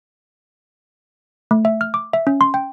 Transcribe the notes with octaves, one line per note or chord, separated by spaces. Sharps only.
A3
E5
F6
D6
E5
C#4
C6
G5